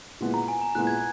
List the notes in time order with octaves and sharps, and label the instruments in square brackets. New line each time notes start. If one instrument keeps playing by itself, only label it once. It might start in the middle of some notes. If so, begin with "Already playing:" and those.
[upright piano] A#2 G#3 B3 E4
[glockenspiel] A#5
G#5
A#5
[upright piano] A#2 G#3 B3 E4 [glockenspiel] F#6
[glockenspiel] G#6